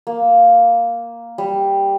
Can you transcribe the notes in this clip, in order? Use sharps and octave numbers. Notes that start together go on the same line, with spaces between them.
A#3
G3